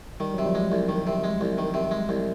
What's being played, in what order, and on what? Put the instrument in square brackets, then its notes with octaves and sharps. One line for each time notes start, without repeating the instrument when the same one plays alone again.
[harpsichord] D#3 [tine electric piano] G3
[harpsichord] C3 [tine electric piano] F#3
[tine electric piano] F3 G3
[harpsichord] G#3
C2
D#3
C3
G#3
C2
D#3
C3
G#3
C2